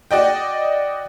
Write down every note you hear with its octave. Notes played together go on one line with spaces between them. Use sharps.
F#4 D5 D#5 G5